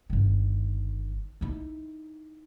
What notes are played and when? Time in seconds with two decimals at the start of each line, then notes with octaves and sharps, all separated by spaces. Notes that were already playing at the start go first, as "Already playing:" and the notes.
0.10 G1 D#3
1.41 D#4 E4